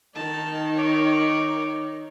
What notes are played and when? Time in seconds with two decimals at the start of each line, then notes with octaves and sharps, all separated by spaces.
0.15 D#3 D#4 A5
0.75 C#5 D6